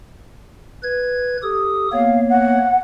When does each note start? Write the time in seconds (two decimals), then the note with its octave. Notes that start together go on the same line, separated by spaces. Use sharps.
0.83 B4 G#6
1.43 G4 A4 D#6
1.93 A#3 B3 C#5 F5
2.29 F#5